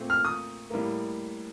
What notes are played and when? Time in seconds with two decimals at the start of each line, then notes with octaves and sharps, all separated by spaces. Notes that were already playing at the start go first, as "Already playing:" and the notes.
Already playing: A#2 A3 C4
0.10 F6
0.25 D#6
0.70 A2 G3 A#3